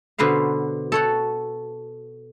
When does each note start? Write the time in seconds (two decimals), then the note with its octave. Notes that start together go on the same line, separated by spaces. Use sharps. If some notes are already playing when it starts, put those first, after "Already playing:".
0.18 B2 D3 B4 C5 F5
0.92 A4 C#5 F#5